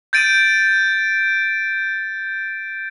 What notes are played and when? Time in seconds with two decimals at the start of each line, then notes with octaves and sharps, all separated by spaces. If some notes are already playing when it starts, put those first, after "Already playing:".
0.13 G6 A6 D7 D#7